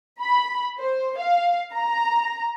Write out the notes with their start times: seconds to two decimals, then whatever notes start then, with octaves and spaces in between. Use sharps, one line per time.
0.21 B5
0.79 C5
1.18 F5
1.74 A#5